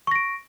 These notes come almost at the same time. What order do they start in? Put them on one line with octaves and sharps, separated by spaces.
C#6 A#6 D7